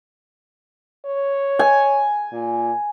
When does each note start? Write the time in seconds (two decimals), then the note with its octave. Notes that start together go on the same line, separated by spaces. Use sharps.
1.06 C#5
1.59 G#5
2.32 A#2